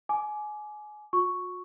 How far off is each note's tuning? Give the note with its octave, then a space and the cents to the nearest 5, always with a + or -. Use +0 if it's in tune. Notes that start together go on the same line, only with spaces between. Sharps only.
G#5 +25 D6 +0
F#4 -45 C#6 +0